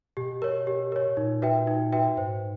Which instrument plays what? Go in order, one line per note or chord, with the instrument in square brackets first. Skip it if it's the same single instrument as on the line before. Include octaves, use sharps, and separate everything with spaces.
[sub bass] B2 [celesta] G4
[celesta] A#4 C#5
G4
A#4 C#5
[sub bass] A#2 [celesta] D#4
[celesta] F#4 B4 E5 G5
D#4
F#4 B4 E5 G5
[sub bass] G#2 [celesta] C5